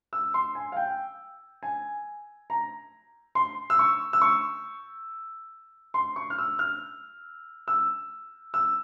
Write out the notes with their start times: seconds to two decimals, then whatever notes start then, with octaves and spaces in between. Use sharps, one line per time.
0.13 E6
0.34 C6
0.55 G#5
0.72 F5
0.77 G5
1.63 G#5
2.50 A#5
3.35 C6
3.70 E6
3.79 C#6
4.13 E6
4.22 C#6
5.94 C6
6.16 C#6
6.30 F6
6.38 E6
6.59 F6
7.68 E6
8.54 E6